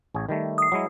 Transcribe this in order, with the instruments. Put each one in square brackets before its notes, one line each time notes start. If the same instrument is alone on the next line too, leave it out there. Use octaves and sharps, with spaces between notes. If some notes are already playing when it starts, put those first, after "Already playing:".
[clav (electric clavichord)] A1 G#4 C#5
D#3 G3 A3
[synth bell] D#6 C7
[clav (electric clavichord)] F#3 G#3 E4